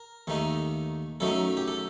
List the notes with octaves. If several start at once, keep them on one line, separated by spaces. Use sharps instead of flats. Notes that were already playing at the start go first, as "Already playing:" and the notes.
Already playing: A#4
D#2 D#3 A3 D#4
F#2 F#3 A3 D#4 A4
G4
A4